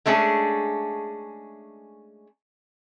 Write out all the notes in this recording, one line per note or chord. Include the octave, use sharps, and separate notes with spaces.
G#3 A3 C#4 D4 G#4